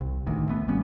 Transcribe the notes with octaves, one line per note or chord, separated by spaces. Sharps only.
C2
A1 D2 D#3
A3 B3
G#1 G3 B3 C#4